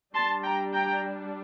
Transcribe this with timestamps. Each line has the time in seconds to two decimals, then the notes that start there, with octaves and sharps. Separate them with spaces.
0.14 G3 D4 A5 C6
0.43 G5 A#5
0.73 G5 A#5